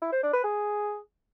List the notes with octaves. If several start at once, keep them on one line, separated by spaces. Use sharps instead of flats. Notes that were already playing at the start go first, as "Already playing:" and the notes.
E4
C5
D4
B4
G#4